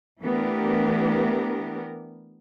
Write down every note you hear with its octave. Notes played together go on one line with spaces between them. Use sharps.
E3 A3 B3 D4 G4 A#4